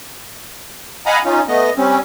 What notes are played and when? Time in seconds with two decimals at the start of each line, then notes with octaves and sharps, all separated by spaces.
1.06 D#5 F5 F#5 G#5 A#5 B5
1.25 C#4 D#4 F4
1.48 A3 B3 D#5
1.77 G3 C4 C#4